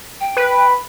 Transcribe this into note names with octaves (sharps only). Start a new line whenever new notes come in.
G5
B4